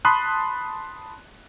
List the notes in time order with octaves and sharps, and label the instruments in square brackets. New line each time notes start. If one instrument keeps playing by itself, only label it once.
[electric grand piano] A5 B5 C6 D#6 F#6